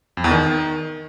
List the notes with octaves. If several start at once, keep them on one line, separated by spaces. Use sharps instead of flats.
F2
E2
D#3